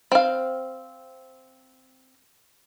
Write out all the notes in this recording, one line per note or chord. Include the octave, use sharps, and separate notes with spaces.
C4 F5